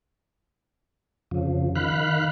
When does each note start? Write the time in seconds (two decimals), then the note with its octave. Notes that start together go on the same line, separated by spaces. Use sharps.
1.31 F2 C#3 F3
1.75 D#3 F5 B5 F#6